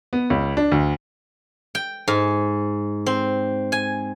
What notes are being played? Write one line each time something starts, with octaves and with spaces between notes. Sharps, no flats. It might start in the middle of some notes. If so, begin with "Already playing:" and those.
B3
C#2
D4
D2
G5
G#2
C4
G#5